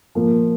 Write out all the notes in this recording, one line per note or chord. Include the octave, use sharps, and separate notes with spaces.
A#2 F3 A#3